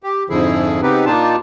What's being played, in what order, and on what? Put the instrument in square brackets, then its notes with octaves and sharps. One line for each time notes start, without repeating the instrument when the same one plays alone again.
[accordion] G4
F2 G#2 D3 F3 E4 G#4
C#3 B3 C4 D#4 G4 B4
A#2 A#3 D4 D#4 F4 A5